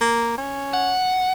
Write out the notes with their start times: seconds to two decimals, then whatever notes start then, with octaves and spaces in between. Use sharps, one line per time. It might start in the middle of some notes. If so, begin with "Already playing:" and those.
0.01 A#3
0.38 C#4
0.73 F#5